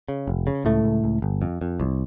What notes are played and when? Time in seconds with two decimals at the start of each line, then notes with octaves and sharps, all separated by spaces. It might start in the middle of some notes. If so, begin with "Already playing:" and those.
0.08 C#3
0.28 F1
0.47 C#3
0.65 C#2 A2 A3
0.84 C#2
1.04 C#2
1.22 G1
1.42 F2
1.61 F2
1.80 C2